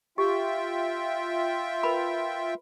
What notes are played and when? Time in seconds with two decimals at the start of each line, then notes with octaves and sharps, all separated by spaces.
0.18 F4 G4 E5 G5
1.83 A#4 B4 B5